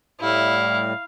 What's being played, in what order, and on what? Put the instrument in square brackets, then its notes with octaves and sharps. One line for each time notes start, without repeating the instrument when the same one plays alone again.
[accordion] A2 G3 [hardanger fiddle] E4 [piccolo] F5